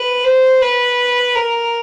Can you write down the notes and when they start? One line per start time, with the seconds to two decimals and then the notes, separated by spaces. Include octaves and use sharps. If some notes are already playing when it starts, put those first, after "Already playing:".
Already playing: B4
0.24 C5
0.62 B4
1.36 A#4